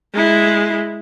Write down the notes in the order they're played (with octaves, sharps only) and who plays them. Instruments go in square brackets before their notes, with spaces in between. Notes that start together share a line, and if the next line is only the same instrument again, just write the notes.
[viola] G#3 E4